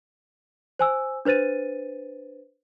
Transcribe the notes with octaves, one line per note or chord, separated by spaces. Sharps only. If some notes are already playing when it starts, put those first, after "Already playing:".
C5 G#5 E6
D4 B4 C5 A6 D#7